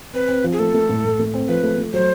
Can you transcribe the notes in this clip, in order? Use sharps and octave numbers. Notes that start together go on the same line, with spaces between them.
C4 B4
C4
F3
G#4
A3 A4
A3
A2
A2
A3
C4
F3 B4
A3
A3
F#3 C5